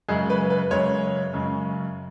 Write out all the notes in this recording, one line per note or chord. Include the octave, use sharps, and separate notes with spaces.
F#2 C#3 G#3 G#4
B4
B4
F#2 C#3 G#3 C#5
F#2 C#3 G#3